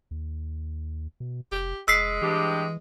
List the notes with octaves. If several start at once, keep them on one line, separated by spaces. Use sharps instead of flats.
D#2
B2
F1 G4
F1 G#3 E6 B6 C7
G2 E3 G4